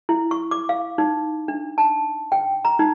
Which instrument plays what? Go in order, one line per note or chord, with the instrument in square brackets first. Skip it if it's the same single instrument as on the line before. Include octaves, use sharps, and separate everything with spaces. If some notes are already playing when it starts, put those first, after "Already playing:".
[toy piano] E4
C#6
D6
F5
D#4
D4
A5
G5
A#5
D#4